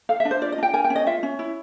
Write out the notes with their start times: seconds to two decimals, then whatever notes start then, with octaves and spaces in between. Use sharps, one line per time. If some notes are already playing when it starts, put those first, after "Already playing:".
0.09 A4 F5
0.20 E5
0.25 D4
0.31 C5
0.41 F4 D5
0.52 D#5
0.58 D4 G5
0.73 A#4 G#5
0.84 G5
0.90 C#4
0.96 D#5
1.07 F4 E5
1.23 C#4
1.39 E4